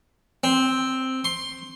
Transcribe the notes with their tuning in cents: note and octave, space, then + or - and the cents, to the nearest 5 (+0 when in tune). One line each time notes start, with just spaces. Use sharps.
C4 +0
C6 +10